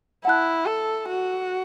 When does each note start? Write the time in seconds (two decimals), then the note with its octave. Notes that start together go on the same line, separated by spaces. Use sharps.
0.25 E4 F#5 A5 F#6
0.66 A4
1.09 F#4